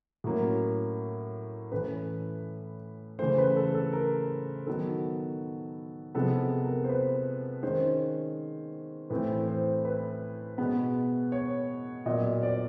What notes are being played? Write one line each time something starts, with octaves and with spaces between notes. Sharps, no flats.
A2 F#3 A#3 C#4
A2 E3 A3 C#4 B4
C#3 E3 A3 C5
B4
A4
A4
A#4
D#3 F#3 B3 A4
C3 F3 G#3 B3 A4
A#4
C5
B4
D#3 G#3 C#4 C5
A2 E3 A3 C4 B4
C5
B4
B2 G#3 B3
C#5
A#2 F#3 B3 D#5
D5